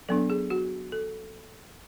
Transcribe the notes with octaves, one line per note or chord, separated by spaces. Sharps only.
F#3 B3 D4 A4
G#4
F#4
A4